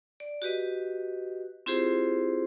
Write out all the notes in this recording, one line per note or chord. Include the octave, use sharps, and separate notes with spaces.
D5
F#4 G4 B4 D#5
C4 E4 F4 G4 G#4 C5